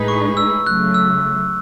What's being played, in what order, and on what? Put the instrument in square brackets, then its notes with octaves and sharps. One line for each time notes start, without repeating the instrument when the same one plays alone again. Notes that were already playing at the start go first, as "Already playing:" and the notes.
Already playing: [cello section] A2 G#3 D#4 G#4 B4
[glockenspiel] C#6
E6
[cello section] C#3 F#3 A3 [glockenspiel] F#6
[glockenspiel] E6